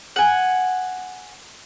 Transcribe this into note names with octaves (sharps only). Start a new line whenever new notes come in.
F#5 G#5